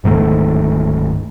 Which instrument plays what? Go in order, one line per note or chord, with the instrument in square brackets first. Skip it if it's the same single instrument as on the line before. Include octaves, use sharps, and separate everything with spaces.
[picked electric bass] D1 G#2 D#3 A3